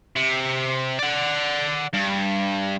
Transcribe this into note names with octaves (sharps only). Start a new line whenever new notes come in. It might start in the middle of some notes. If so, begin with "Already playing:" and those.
C3
D5 F#5
G2